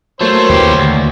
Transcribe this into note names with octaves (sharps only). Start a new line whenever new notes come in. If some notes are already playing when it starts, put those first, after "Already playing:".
F#3 A3 A#3 C5 C#5 C6
D#2 A#3 E4 G4 B4
D2